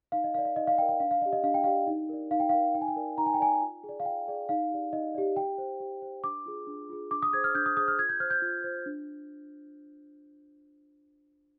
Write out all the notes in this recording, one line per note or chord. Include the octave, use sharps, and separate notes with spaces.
D#4 F5
D#5
A#4 D5 F5
F5
D#4 D#5
F5
A#4 D5 G5
G5
D4 F5
F5
G4 D5 D#5
D#5
D4 F5
G5
G4 D5 F5
D#4
A#4 D5
D#4 F5
G5
F5
A#4 D5
D#4 G5
G#5
G5
A#4 D5
D#4 A#5
G#5
G5
A#4 D5 G#5
F4
G#4
D5
F5
F4 G5
G#4 D5
D#4 F5
G4 D5
D#4 D#5
G4 D5
G4 G5
C5
G4
C5
D4 D6
F4 G#4
D4
F4 G#4
D4 D6
D#6
G#4 C5 G#6
F6
D4 G6
D#6
G#4 C5 D#6
F6
F4 G#6
G6
C5 F6
G6
F4
C5
D4